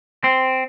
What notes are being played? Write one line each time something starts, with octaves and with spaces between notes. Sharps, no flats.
C4